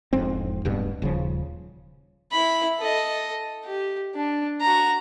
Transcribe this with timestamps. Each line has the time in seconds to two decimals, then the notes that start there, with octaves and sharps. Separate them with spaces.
0.13 E1 F2 G#2 C4
0.65 D1 G2 B2
1.02 D#1 C#3 F3
2.32 E4 B5
2.79 A4 D#5
3.65 G4
4.15 D4
4.61 F#4 A#5